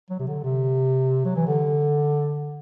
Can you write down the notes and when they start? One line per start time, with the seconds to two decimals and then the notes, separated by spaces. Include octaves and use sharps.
0.10 F#3
0.19 C3
0.27 D3
0.44 C3
1.25 F#3
1.36 E3
1.47 D3